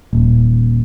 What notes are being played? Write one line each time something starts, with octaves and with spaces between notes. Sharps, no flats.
D#1